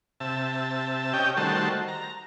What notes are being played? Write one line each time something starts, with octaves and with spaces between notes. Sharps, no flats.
C3 E5 A5
C#4 G4 D#5 G5
D#3 G3 A3 F#4 C5 A5
A#5